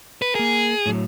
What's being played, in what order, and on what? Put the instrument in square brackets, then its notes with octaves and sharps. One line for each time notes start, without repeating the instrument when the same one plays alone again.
[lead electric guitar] B4
[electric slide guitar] A#3 A#4 [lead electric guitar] G#4
[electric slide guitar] A2 F#3